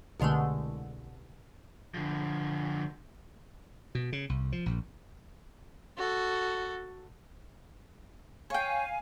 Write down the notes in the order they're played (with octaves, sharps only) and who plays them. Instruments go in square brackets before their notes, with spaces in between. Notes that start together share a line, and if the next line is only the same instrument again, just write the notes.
[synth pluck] C2 B2 D3 G#3 A3
[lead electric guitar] D3 F3
[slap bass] B2
C#3
C2
F3
A#1
[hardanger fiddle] F#4 A4
[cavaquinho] C#5 G5 [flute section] F5 G#5